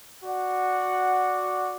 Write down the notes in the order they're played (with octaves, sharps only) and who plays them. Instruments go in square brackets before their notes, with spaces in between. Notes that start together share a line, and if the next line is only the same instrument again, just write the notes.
[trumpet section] F#4 D5 F#5